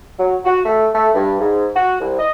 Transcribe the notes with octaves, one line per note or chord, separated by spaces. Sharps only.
F#3
F#4
A3
A3
G2
G#2
F#4
C2
D#5